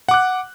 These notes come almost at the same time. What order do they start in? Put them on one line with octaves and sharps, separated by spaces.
F#5 D6 F#6